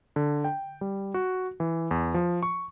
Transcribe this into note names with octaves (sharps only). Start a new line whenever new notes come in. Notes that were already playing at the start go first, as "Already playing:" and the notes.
D3
G5
G3
F#4
E3
E2
F3
C#6